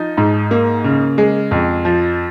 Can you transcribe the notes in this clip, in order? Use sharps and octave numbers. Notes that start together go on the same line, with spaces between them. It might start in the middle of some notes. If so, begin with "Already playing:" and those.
Already playing: F3 D#4
G#2
A#3
C#3
G#3
F2
F3